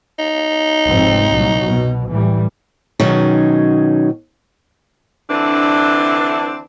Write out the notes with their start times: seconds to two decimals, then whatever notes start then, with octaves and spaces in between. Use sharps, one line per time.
0.19 D#4
0.87 F1 G#2 C4
1.33 C2 A#2 F#3
1.65 B2
2.09 A2 E3 G3
3.00 B2 D#3 F#3 C#4 D#4 G#4
5.30 D3 E3 C4 D4